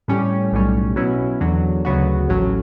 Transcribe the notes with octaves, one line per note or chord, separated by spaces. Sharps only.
A2 G3 C#4 G4
B1 A2 G3 C#4
B2 F#3 C#4 E4
E2 D3 F#3
D2 C#3 F#3 B3 F#4
A1 A2 F#3 C#4